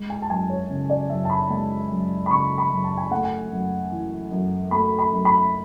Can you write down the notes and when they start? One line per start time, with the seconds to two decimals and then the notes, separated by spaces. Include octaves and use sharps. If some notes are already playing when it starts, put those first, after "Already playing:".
Already playing: G#3
0.10 G#5
0.22 A5
0.30 F#2 G#5
0.50 C#5
0.70 C#3
0.90 D5
1.10 F#2 E5
1.25 A5
1.30 B5
1.50 G#3 A5
1.91 F#2
2.26 B5
2.30 C#3 C#6
2.58 B5
2.71 F#2
2.84 A5
2.97 G#5
3.11 A3 F#5
3.24 G#5
3.51 F#2
3.91 E3
4.31 F#2
4.71 A3 B5
4.99 B5
5.12 F#2
5.25 B5